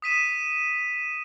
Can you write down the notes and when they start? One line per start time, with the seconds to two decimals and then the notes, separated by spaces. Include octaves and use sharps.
0.02 D#6 B6 D#7 E7